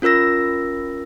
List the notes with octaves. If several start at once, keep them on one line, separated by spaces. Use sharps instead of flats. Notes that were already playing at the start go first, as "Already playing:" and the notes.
C#4 F4 A#4 E6 A#6